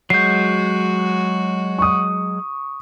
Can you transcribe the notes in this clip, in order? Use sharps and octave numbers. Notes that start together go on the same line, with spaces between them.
F#3 G#3 F#4 G6 C7
C#6 D#6